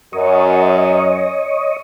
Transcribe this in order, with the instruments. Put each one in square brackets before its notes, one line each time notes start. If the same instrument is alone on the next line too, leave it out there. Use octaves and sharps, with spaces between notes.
[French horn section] F#2 [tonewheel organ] C#5 D#5